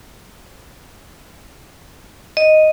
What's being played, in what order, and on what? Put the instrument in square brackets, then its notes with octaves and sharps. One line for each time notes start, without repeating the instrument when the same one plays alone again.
[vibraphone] D#5